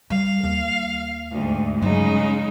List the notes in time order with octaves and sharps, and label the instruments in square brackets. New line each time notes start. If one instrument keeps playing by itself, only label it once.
[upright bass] G3 [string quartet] F5
[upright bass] D#2 A#3
[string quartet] D2 G#2
[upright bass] G2 F#3 [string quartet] C#3 G#3 D#4